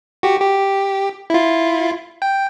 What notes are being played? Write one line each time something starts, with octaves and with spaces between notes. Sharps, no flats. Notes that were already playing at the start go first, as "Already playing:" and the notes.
F#4 G4
G4
E4 F4
G5